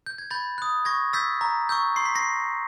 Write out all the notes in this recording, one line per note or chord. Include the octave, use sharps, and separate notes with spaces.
G6
G#6
B5 G6 A6
D#6 F#6
C#6 G#6 A#6
E6 G6 A6 B6
A#5
C#6 E6 G6
C6 C7
B6
A#6 C7